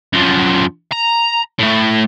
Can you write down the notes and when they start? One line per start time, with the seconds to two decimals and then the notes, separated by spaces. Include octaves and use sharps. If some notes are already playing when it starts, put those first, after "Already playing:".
0.13 F#2 F3
0.92 A#5
1.59 A2 A3